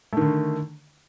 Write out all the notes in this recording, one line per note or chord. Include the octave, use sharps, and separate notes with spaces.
D3 D#3 A3